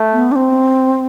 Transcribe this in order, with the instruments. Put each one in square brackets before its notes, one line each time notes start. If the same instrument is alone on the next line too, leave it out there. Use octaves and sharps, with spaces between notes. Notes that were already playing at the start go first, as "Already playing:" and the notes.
Already playing: [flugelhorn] A3
[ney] B3
D4
C4